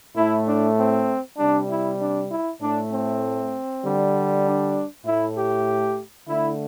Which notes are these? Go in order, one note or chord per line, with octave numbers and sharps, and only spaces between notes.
A2 A3 E4
D4
C4
C3 G3 D4
E4
D4
E4
A2 A3 D4
C4
D3 G3
D4
A2 A3 E4
G4
D3 A3 E4